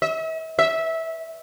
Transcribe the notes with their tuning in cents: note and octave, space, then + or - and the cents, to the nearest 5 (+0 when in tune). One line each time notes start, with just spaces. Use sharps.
E5 -40
E5 -15